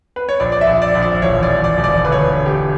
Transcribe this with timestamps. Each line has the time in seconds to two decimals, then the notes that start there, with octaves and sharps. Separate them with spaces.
0.16 B4
0.29 C#5
0.40 A#1 D5
0.52 D5
0.61 E5
0.67 A#1
0.82 D5
0.95 A#1
1.02 D5
1.22 E1 C#5
1.43 D5
1.50 E1
1.64 D5
1.77 E1
1.84 D5
2.04 D2 B4
2.12 C#5
2.19 B4
2.32 D2
2.46 G4